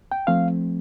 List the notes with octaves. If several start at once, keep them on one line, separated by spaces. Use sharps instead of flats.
G5
F3 A3 C4 F5